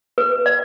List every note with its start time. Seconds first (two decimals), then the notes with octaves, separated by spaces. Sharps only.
0.18 B4
0.46 D5